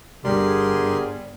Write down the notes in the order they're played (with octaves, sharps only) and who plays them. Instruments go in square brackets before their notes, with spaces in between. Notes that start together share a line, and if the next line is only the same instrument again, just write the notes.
[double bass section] G1 [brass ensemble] D3 G#4 [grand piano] G3 [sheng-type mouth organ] G4 A#4 C6